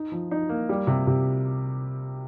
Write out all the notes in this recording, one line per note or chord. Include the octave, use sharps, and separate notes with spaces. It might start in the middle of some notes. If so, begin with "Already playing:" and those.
Already playing: D#4
F3
D#4
A#3
G3
C3
C3